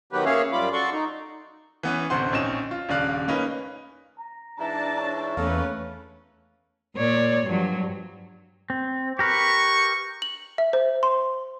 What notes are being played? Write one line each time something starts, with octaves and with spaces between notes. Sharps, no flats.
D#3 F#3 B3 G4 B4
A#3 C#4 G#4 C#5 E5 F5
F#2 G3 F4 B5 D6
F#4 A4 D5 C6 C#6
D#4
E3 B3 C#4
A1 D2 C3 C5 F#5 C6
A#1 C4 C#4 D#4 E7
F4
D#1 C#3 D4 D5 F5 F#6
A#3 C#4 D#4 B4
A#5
G#2 E3 D4 E4 A5 A#5
C#5
E2 A3 A#3 C#4 A4 B4
A#2 C#5 D5
G2 F3 F#3
C4
G4 A#4 B4 C#6
F#7
E5
C5
C6